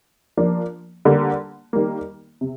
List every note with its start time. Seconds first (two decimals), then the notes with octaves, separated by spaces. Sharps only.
0.37 F3 A#3 D4
1.05 D3 G3 A#3
1.73 D#3 G3 A#3
2.41 C3